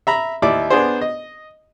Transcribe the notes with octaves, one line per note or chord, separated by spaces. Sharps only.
E5 A#5 B5
D#2 E4 D5 D6
B3 D4 G#4 C5
D#5